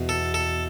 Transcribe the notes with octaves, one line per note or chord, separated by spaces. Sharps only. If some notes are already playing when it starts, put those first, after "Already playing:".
Already playing: E2 B2
A4
A4